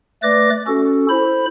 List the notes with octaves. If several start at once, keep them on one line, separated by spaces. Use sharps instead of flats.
A3 B4 D5 D6 A#6
C#4 F#4 A4
E4 C5 B5